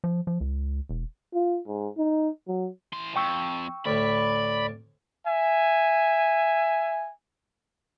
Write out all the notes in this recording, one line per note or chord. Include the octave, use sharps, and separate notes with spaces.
F3
F3
C#2
E1
F4
G#2
D#4
F#3
E3 C6
F2 G5 C#6 E6
D2 A2 D5 B5
E5 G#5